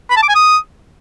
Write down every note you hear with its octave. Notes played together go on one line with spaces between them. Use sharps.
B5
A5
D6
G#5
D#6